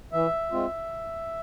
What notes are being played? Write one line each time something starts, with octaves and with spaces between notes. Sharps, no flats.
E3 E5
G#3 C4 F4